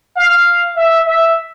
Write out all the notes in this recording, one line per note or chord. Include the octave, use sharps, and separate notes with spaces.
F5
E5
E5